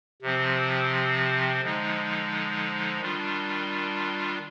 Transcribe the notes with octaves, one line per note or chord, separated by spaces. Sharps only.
C3 F3 C4
D3 F3 G#3 D#4
D#3 G3 D4 F4